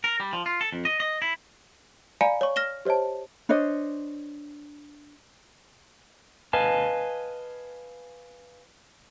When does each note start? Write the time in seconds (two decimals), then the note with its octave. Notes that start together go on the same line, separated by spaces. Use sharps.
0.04 A#4
0.20 G3
0.33 F3
0.46 F4
0.61 A4
0.72 F2
0.85 D#5
1.00 D#5
1.22 E4
2.21 D5 F5 G#5 A#5 B5 C#7
2.41 C#5 C#6
2.56 F6 A#6 E7 G7
2.85 G4 C5 C#5 D#5 A5
3.49 D4 C5 C#5 D#5
6.53 B4 D#5 F5 G#5 A5